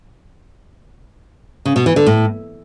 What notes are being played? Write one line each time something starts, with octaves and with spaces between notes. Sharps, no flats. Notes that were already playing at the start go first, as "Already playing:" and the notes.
C#3
B2
E3
D3
A2